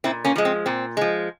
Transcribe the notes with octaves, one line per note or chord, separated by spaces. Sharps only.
A#2 C4 E4
A#3 C#4
F3 G#3
C4
A#2 C4
F3 G#3